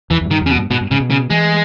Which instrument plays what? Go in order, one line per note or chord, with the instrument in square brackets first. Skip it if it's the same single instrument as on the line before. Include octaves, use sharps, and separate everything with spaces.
[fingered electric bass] E2 [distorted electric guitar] E3
[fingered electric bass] E2
G2
[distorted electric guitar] D#3
[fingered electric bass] E2 [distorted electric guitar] C#3
[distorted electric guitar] B2
[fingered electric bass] G2
[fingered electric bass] G#2 [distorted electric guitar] B2
[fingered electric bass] G2
[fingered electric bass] G#2 [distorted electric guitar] C#3
[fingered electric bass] B2
[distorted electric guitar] C#3
[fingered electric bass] E3 [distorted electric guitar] G#3